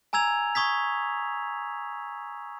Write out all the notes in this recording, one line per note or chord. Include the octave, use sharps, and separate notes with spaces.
G#5 A#5 E6 G#6 F7
C#6 D#6 G#6 B6